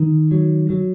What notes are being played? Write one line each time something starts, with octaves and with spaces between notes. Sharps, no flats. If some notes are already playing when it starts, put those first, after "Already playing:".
Already playing: D#3
F#3
F#3